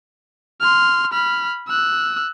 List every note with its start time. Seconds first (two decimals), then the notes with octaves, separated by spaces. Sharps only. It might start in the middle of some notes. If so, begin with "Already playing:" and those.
0.61 C6 F6
1.12 B5 F6
1.68 E6 F#6